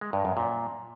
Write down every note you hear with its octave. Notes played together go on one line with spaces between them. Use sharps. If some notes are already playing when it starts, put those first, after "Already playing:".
G#3
G2
F#2
A#2